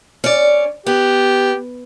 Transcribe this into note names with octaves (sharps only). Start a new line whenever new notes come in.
C#4 D5
B3 G4